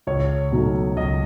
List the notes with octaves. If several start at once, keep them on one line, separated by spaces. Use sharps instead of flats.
C#2 C#5
B2 F#3 A3 D#4
C#2 D#5